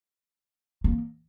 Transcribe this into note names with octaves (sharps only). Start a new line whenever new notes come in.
A#3